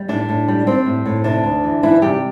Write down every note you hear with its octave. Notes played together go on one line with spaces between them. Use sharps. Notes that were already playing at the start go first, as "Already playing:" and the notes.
Already playing: G3
A2 D4
A2
G3
G3 C4
A2
A2
C3 D4
D2
E3
D2 E3 E4
C3 G3 G4